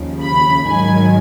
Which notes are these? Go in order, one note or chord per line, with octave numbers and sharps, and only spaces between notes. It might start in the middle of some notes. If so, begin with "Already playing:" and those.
Already playing: D#2 C#3 F3
B5
G#2 D#3 F#3 G#5